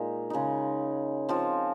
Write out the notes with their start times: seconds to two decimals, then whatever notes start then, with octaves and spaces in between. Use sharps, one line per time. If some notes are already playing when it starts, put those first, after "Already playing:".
Already playing: A#2 G#3 D#4
0.30 C#3 G#3 D#4
1.29 F3 C4 F4